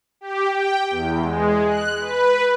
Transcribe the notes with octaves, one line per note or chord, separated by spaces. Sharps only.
G4
G5
E2
G#3
F#6
B4